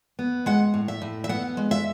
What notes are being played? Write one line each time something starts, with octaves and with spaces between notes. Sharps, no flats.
B3
G#3 F#5
A2
E5
A2
E5
B3 F#5
G#3
E5